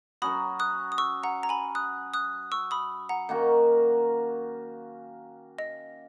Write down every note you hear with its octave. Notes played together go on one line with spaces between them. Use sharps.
F#3 C#4 F#4 B5 D#6
D#6 F#6
D#6
C#6 E6
F#5 A#5
A#5
G#5 B5
D#6 F#6
D#6 F#6
C#6 E6
B5 D#6
F#5 A#5
D#3 A#3 C#4 F#4 F#5
D#5